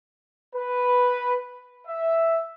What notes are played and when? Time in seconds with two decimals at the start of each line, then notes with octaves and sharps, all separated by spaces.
0.55 B4
1.86 E5